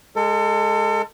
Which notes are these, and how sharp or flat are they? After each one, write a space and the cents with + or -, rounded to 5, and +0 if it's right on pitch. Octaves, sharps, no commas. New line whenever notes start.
G#3 +0 A4 +35